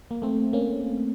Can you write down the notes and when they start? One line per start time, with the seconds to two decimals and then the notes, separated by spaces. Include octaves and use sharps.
0.11 A#3
0.22 A3 C4
0.53 A#3 C#4